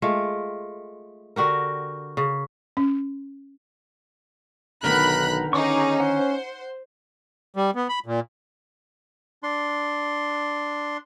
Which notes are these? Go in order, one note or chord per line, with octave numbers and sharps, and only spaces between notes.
G#3 A3 F4
D3 F#4 G4 A#4
C#3
C#4
B1 D3 D#3 B3 A#4 B5 F#6
C#4 D#4 G#4 C#6 D6
C5 F#5
G3
B3
B5
A#2
D4 C6